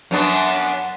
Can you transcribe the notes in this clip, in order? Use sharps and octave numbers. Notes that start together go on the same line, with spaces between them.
F#2 B3 D4